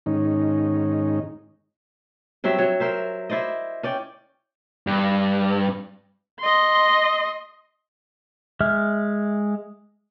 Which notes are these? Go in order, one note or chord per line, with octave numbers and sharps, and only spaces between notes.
G#2 D#3 C#4 D#4
G2 F#3 C4 E5
F#3 C#5
A#4 C5 E5
E4 C5 D5 D#5
C#4 D5 G5
G2
D#5 C6
G#3 E5 F6